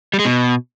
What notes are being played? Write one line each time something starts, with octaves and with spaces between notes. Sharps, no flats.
G3
G#3
B2